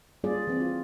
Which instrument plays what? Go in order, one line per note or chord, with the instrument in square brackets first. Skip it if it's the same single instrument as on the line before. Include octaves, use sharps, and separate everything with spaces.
[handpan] G3 A#3 C#4 F4 G#4 D5
E3 C4
F4